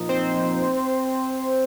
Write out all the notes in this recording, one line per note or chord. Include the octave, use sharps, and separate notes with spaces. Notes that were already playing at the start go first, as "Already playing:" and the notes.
Already playing: A#2 F3 D#4
C4 C5